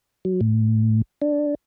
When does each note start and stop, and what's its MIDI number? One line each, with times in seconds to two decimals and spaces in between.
0.25 0.40 54
0.41 1.02 45
1.22 1.55 62